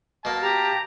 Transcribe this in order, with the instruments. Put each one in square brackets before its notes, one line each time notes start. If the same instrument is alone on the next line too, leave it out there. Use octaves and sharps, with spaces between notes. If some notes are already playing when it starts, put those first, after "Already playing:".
[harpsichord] B2 A#3 [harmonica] A5
[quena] G4 [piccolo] A#5